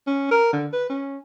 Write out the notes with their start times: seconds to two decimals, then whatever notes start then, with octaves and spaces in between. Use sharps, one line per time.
0.07 C#4
0.31 A#4
0.53 D3
0.73 B4
0.90 C#4